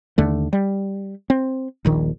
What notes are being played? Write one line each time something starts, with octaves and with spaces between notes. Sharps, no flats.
D#2 D3 A3
G3
C4
D#1 A#1 D#3